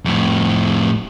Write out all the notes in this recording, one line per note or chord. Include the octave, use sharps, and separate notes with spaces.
F2 A2